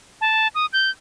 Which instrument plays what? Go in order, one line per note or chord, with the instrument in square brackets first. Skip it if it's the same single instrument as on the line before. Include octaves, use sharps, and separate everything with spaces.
[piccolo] A5
D#6
G6